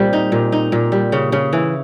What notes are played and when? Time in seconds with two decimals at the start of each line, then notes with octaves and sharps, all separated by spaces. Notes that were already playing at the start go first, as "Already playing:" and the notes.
Already playing: A#2 G3 C4
0.13 D#4
0.32 A#2
0.52 D#4
0.72 A#2
0.92 G3
1.12 C#3
1.32 C#3
1.53 E3